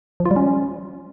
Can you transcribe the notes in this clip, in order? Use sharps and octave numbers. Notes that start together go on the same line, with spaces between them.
F3
F4
G3
C#4